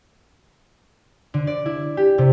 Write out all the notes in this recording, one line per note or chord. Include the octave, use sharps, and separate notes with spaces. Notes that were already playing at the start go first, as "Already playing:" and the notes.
D3
D5
E4
G4
C3